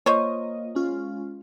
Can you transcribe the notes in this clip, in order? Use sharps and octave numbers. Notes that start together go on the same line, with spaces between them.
A#3 F4 C5 C#5 D#5
G#3 C#4 F4